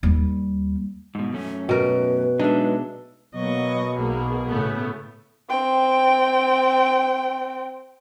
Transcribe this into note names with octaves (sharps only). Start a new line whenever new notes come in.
D#2 G3
G#2 B2
F#2 A3 C#4
B2 A#4 B4
F#3 G#3 D4 D#4 E5
B2 F#3 A#3 D#5 C#6
B1 A#3 G#4
A2 C#3 A3 B3
C4 G5